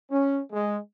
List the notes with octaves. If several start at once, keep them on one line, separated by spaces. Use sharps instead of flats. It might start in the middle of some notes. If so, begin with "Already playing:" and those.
C#4
G#3